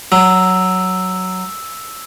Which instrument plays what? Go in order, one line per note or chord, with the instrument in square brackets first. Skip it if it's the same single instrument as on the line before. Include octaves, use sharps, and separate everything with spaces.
[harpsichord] F#3 [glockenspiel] E6